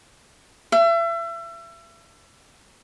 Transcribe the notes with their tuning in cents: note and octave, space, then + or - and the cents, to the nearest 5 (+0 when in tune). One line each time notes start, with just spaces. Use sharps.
E5 +35